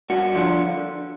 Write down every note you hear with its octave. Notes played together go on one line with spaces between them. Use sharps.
G2 F#4
D3 F3